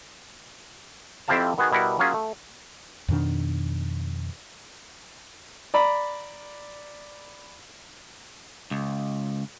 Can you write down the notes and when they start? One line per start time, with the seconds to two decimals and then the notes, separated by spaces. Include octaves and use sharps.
1.28 F2 C4 E4 G4 F5 A5
1.58 D#3 B3 F#4 G#4
1.72 B2 G3 E4 A#4 F#5
1.99 F#3 A#3 C#4 F4 G#4
2.14 A3
3.08 F2 B2 D#3 D4
5.74 D5 A#5 B5
8.71 C#2